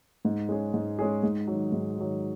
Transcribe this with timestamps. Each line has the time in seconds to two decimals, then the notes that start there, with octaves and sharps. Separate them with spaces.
0.25 G#2
0.49 G#3 C#4 G#4
0.74 G#2
0.99 G#3 C#4 G#4
1.23 G#2
1.47 D#3 F#3
1.72 G#2
1.97 D#3 F#3